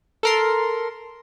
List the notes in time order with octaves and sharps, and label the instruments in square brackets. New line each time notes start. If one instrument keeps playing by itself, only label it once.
[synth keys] A4 A#4 C6